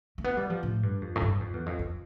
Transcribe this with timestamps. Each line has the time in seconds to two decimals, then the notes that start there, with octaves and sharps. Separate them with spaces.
0.18 A3
0.24 B3
0.37 G3
0.50 F3
0.63 A2
0.83 G2
1.02 F2
1.16 A2
1.22 G2
1.41 F2
1.53 E2
1.66 F2
1.79 F2